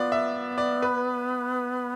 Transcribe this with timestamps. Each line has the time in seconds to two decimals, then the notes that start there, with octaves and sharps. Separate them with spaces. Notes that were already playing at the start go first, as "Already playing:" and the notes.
Already playing: B3 F4 D5
0.12 E5
0.58 D5
0.82 B4